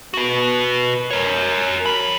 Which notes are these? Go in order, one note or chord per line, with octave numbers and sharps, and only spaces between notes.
F#4 B4
A#4 C#5
F3 B5